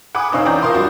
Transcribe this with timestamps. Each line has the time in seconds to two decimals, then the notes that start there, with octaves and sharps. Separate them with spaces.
0.15 F#5 G#5 B5 D6 D#6
0.32 F1 C4 D#4 C#5 F5 E6
0.45 E3 C#4 D5 G5 A#5 G6
0.62 F4 A#4 F5 A5 C6 D#6
0.74 G3 D4 F4 F#4